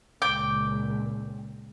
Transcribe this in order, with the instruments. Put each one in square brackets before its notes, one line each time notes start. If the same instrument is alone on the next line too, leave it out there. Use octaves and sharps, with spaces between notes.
[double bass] C#2 A#2 [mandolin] G5 D6